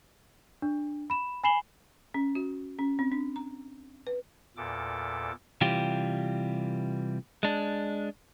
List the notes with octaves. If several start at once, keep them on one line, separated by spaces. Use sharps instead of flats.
D4
B5 E7
G#5 B5 C7 E7 F#7 G7
C#4
F#4
C#4
C4
D4
A#5
B4
E2 A#2 A4 D6
C3 E3 G3 F4 G4
G#3 D4